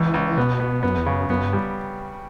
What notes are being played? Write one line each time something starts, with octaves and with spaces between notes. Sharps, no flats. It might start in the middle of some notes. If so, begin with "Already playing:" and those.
Already playing: C#2 E3
C#2
B2 B3
B3
F#2 B3
E2
F#2 C#3
F#2 B3
G2
G3